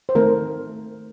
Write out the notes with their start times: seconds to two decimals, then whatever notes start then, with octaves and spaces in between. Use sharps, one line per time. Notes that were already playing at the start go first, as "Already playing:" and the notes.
0.09 C5
0.15 D#3 A3 C4 A#4